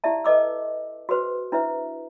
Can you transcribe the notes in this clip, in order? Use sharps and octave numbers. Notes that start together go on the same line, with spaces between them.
E4 G4 D5 E5 A5
A4 B4 D#5 D6 E6
F#4 G#4 B4 C5
D4 E4 B4 C5 E5